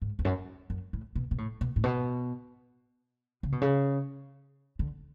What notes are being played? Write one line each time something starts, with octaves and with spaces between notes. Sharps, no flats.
G#2
E2
F#2
F#2
A2
B2
B2
A2
B2
A2
B2
C#3
B2
C#3
D3